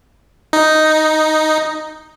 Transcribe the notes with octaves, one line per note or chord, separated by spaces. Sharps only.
D#4